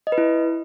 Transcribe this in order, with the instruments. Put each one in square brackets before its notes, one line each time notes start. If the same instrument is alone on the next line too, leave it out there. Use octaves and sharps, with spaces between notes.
[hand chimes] D#5
B4
E4